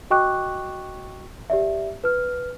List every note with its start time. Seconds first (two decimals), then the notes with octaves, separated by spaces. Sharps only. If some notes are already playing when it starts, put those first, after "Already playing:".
0.11 F#4 D#5 G5 C#6 D6 F#6
1.50 G4 D5 E5
2.04 B4 F6